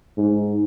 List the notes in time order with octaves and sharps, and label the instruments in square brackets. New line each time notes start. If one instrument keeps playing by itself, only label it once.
[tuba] G#2